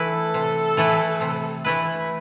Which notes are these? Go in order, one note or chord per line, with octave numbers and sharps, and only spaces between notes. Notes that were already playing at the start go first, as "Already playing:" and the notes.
Already playing: E3 A3 E4 A4 B4
C3
E3 A3 E4 B4
C3
E3 A3 E4 B4